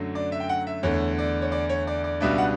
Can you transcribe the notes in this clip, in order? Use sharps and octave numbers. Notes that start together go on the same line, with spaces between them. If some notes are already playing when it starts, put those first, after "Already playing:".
Already playing: F#2 D3 F#3 A3
D5
E5
G5
F#5
E5
E2 D3 A3 C#5
D5
C#5
D5
C#5
D5
D5
C#2 B2 G3 B3 D4 E5
F#5